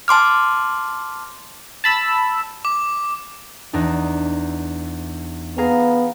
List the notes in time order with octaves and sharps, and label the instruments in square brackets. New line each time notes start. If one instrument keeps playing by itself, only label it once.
[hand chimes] A5 C6 D6 F6
[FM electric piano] A5 B5 E6
[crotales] D6
[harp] E2 D4 D#4
[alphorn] B3 [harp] G#4 F5 A#5